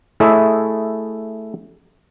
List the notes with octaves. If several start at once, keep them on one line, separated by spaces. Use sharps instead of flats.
A3 E4 G#4 C#5 D#5 E5